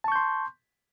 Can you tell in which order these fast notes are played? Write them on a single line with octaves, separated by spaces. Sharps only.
A5 C#6 G6 C6